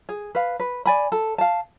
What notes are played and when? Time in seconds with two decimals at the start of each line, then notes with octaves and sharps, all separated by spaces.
0.09 G#4
0.35 B4 F5
0.59 B4
0.86 D5 G#5 B5
1.12 A4
1.38 F5 A5